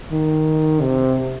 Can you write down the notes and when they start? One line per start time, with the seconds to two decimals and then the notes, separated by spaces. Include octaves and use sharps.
0.12 D#3
0.81 C3